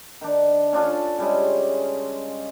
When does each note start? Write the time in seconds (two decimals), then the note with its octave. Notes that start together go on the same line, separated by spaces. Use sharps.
0.21 D#3 D4
0.73 C#4 D4 F4 A4
1.18 C#3 G3 G#3